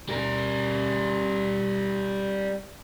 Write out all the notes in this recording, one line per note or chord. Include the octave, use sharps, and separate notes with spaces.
G3 A#4